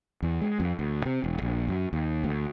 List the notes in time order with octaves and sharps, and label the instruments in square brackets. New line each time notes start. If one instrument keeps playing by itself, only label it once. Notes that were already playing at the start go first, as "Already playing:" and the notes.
[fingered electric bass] E2
G#3
F2
D2
C3
E1
A#1
F#2
D#2
D2